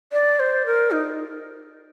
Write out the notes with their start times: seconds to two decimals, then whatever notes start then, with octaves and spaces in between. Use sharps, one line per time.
0.12 D5
0.40 C5
0.66 A#4
0.91 D#4